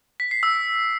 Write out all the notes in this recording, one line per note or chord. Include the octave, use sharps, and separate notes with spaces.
B6
C7
E6